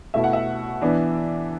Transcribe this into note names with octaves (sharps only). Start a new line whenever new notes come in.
B2 A3 E4 E5
F#5
E5
E3 B3 D4